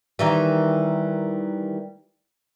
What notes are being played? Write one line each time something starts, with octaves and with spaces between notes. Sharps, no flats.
D#3 E3 G3